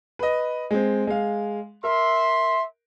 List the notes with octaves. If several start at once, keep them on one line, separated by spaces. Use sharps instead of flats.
B4 D#5
G#3 C4
G#3 F5
A#4 E5 C6